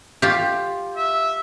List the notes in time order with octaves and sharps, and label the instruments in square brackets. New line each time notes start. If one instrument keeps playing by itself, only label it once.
[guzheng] F4 G4
[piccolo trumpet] E5